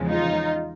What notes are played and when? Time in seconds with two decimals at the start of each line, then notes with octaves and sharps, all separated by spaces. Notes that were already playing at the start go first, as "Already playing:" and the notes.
Already playing: E2 C#3 F3 G#3
0.09 D#4 F4